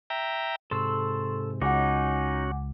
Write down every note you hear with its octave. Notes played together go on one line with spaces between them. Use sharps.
E5 G5 A#5
G#2 C3 A4 C6 C#6 E6
C#2 C#4 D#4 F#4 F#5 G#5 D6